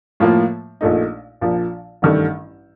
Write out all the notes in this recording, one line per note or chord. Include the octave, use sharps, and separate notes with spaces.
A2 F3 A#3 F4
A#1 A#2 A3 D#4
A#1 A#2 F3
A1 G2 D#3 A3 D4